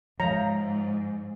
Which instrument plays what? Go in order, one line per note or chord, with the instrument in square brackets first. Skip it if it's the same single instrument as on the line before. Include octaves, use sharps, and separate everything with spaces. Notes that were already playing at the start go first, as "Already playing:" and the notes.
[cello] G#2 [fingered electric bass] F3 [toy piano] C#5 E5 F5 [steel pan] A#5